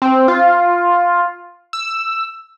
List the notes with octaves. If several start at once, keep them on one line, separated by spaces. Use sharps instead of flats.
C4
F4
E6